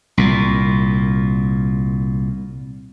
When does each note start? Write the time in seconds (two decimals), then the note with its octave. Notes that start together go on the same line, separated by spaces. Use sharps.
0.17 C2 A#2